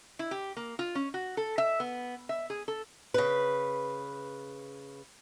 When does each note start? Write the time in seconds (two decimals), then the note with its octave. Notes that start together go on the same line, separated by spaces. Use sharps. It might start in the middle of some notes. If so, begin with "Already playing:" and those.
0.19 E4
0.31 G4
0.57 A#3
0.79 F4
0.95 C#4
1.14 F#4
1.37 A4
1.58 E5
1.80 B3
2.29 E5
2.50 G#4
2.68 A4
3.14 C#3 B4